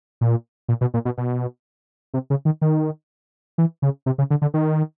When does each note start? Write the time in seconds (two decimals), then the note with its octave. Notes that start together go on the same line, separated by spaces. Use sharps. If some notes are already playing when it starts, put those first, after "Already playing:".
0.21 A#2
0.69 A#2
0.81 B2
0.94 A#2
1.05 B2
1.18 B2
2.14 C3
2.30 C#3
2.45 D#3
2.62 D#3
3.58 E3
3.82 C#3
4.06 C3
4.18 C#3
4.30 D3
4.42 D3
4.54 D#3